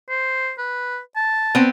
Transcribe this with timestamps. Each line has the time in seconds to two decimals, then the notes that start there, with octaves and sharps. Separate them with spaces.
0.10 C5
0.58 B4
1.16 A5
1.55 B3 C4